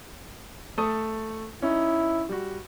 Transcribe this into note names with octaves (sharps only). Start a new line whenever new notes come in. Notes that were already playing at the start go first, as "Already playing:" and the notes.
A3 A4 D#6
C#4 D#4 E4
G3 F#4